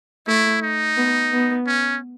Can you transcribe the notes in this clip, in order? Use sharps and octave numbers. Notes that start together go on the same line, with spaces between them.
A3 E4
D#4
B3
B3
C#4